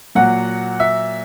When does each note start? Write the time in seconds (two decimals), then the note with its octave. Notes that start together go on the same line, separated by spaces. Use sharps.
0.15 A#2 F#3 F#5
0.80 E5